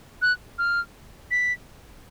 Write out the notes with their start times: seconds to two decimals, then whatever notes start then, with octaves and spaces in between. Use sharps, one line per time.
0.22 F#6
0.58 F6
1.31 B6